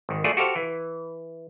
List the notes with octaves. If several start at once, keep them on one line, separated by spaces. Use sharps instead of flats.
G#1 D#3
A3 F4 F#4 G#4 D5 F#5
F#4 G4 A4 C5 F5
E3